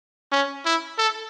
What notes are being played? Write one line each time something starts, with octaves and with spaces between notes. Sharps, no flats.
C#4
E4
A4